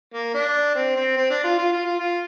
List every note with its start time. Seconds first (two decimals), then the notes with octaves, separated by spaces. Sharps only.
0.13 A#3
0.34 D4
0.75 C4
0.96 C4
1.16 C4
1.30 D4
1.44 F4
1.58 F4
1.72 F4
1.86 F4
1.99 F4